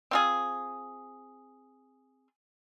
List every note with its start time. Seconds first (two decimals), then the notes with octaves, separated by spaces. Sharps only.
0.11 C4 F4 G#4